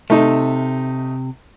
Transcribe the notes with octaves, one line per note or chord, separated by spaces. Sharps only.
C3 A3 D#4